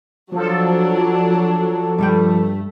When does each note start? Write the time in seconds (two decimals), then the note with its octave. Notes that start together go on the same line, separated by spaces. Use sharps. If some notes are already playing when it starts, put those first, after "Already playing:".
0.32 F3 F#3 D4 A4
1.98 G2 G3 A3 G5